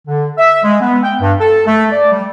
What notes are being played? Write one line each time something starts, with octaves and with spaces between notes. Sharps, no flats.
D3
E5
G#3
B3
G5
G2
A4
A3
D5
G3